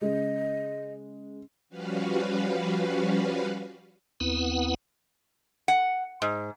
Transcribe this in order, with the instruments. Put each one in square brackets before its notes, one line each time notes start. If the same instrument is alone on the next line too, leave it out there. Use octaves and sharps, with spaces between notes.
[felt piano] C#3 G#3 [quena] D#5
[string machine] F3 G3 C#4 F#4 B4 F5
[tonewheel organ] D#2 B3 C4 E4 B4 F#5
[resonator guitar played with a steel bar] F#5
G#2